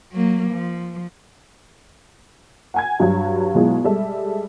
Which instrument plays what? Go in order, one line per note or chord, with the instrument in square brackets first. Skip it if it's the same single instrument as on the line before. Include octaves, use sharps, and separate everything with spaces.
[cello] F#3 A#3
F3
[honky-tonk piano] F#5 G#5 G#6
G2 F#3
B2 F#3 G#3 E4 F4
G3 G#3 A4 E5